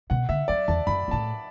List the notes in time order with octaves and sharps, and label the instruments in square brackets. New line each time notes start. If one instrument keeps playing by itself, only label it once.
[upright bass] B2 [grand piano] F#5
[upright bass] D3 [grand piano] E5
[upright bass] F#3 [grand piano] D5
[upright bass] E2 [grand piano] A5
[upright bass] F#2 [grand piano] B5
[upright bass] F#2
[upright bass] A2 [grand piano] A5